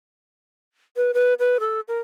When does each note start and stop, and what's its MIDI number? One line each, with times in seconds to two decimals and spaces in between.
0.97 1.11 71
1.14 1.34 71
1.39 1.58 71
1.60 1.80 69
1.88 1.99 70